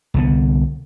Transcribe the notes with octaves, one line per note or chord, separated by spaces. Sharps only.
C2 D3 B3